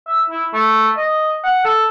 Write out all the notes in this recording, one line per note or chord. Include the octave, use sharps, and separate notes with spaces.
E5
E4
A3
D#5
F#5
A4